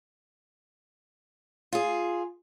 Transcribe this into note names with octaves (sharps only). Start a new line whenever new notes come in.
F4 G#4